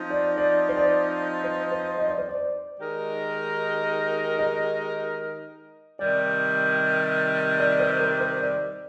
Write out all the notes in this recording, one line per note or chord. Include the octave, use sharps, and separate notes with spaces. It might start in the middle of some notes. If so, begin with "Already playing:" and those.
Already playing: F3 C4 D#4
D5
D5
C5
D5
C5
C5
D#5
D5
C5
D5
D#3 G#3 D#4 G4 A#4
D#5
C3 D#3 G3 D5
D5
C5
A#4
C5
D5